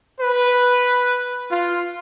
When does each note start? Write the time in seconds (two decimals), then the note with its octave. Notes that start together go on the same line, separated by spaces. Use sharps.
0.20 B4
1.49 F4